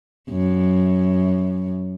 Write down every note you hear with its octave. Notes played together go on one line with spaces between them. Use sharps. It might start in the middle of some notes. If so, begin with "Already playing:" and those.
F#2